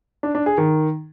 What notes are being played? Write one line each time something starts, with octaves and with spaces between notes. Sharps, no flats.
D4
D4
G#4
D#3